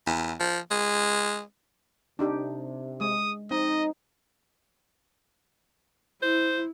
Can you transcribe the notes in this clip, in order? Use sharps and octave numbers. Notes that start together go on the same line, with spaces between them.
E2
F3
G#3
C3 D4 D#4 G4
G#3 D#6
C4 D#4 D#5
E4 C5